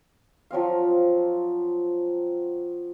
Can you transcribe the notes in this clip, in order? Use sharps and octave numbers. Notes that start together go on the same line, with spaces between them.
F3 F#3 C4 F5